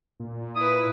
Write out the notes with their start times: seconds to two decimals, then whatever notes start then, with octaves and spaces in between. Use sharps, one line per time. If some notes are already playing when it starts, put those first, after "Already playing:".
0.20 A#2
0.56 E4 B4 D#6